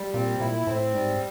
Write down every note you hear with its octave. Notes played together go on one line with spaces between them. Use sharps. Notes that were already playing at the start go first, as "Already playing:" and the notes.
Already playing: G3
A#2 C4
A#2 E4
A2 C4
G#2 G3